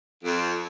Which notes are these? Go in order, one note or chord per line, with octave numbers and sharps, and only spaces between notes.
F2